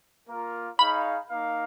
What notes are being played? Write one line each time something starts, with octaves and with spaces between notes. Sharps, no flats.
A#3 F4 A#4
D#4 G#4 C#5 F5 B5
A#3 D#4 A#4 F5